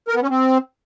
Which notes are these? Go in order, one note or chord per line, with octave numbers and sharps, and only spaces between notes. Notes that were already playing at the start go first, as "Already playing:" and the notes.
A#4
B3
C#4
C4